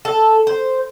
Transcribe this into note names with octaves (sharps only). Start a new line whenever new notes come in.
A4
C5